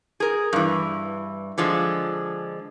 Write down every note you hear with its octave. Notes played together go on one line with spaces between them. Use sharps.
G#4 A#4
G2 E3
D3 F3 G#3